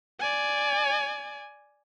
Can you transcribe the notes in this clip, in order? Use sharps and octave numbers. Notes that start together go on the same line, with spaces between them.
D5 G#5